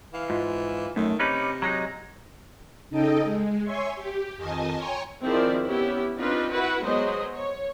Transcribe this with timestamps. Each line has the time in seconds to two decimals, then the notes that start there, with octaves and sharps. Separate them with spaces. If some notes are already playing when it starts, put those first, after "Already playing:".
0.14 E3 F5
0.30 G#2 F4
0.96 F#2 D#3 A3
1.20 C3 C#4 D#4 B4 D6
1.62 F#3 G#3 D#4 A#5
2.89 C#3 D#4 A4 D#5 G5
3.24 G#3
3.63 C#5 E5 G#5 C6 C#6
3.95 G4
4.36 F2 D#3 D#5 G#5 A5
4.75 C#5 G5 G#5 A#5 C6 C#6
5.24 D#3 F3 C4 E4 G#4 D5
5.64 B3 C#4 E4 G4
6.17 C4 D4 D#4 F4 B4
6.52 E4 F#4 B4 F#5
6.81 F#3 G#3 B3 C5 D#5
7.34 C#5